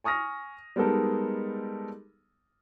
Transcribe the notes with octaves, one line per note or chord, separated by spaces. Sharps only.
G#5 C#6 D#6 F6 A#6
G3 G#3 B3 D#4 A4 A#4